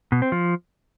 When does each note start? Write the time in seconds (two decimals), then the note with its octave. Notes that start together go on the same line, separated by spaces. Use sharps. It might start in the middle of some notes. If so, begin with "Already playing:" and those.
0.12 B2
0.22 C4
0.32 F3